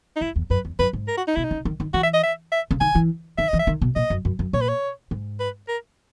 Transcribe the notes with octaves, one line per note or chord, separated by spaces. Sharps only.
D#4
G#2 E4
E2
F#2 B4
E2
F#2 B4
G#2
A#4
F#4
D#4
B2 E4
D#4
C#3
D#3
D#3
E3 F#4
E5
D#5
E5
E5
C#3
D#3 G#5
E3
D#3 E5
E3 D#5
E5
D#3
B2
A#2 D#5
F#2
F#2
F#2
A#2 C#5
B4
C#5
G#2
B4
A#4